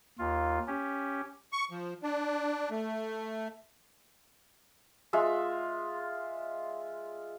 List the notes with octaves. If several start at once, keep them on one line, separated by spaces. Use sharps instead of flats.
D#2 F4
C#4 G4
C#6
F3
D4
A3
G#3 F4 E5